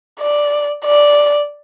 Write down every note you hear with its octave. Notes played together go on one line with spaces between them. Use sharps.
D5
D5